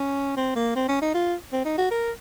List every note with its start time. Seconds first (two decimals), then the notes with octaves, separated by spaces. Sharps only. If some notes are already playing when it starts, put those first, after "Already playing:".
Already playing: C#4
0.37 C4
0.56 A#3
0.76 C4
0.89 C#4
1.02 D#4
1.14 F4
1.53 C4
1.65 D#4
1.78 F#4
1.91 A#4